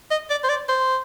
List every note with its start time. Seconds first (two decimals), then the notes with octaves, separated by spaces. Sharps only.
0.11 D#5
0.30 D5
0.44 C5
0.49 D5
0.69 C5